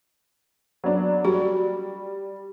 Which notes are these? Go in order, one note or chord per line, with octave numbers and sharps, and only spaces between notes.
F#3 B3 D4
G3 F#4